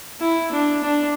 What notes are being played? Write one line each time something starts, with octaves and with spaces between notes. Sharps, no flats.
E4
D4
D4